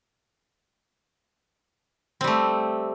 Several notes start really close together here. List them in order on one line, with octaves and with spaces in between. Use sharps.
C4 G3 A3